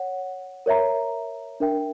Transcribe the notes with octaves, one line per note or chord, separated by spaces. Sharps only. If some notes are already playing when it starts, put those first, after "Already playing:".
Already playing: C#5 F#5
A#4 C#5 E5 A#5
D4 A#4 E5 G5